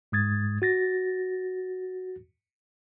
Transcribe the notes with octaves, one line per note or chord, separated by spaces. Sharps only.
G#2 G#3 D#6 G#6 A6
F#4 A6 A#6